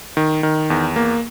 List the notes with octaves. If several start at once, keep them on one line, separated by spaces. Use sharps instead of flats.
D#3
D#3
E2
A#3